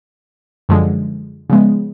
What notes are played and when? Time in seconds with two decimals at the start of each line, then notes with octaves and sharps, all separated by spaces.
0.69 F#2 D3 F3 G#3
1.50 C#3 F3 G#3 B3